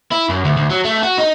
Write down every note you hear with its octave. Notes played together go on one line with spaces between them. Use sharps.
E4
F#2
D2
D2
F#3
A3
F#4
D#4